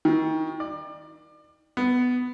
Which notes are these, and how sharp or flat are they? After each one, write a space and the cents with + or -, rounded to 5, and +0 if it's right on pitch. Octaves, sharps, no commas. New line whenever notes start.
D#3 +35
D5 +30
B3 +10